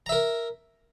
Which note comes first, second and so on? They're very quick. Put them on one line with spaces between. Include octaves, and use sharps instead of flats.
A#5 E5 A#4